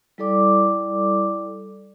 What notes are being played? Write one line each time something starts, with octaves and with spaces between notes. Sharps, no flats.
G3 E4 A4 D5 D6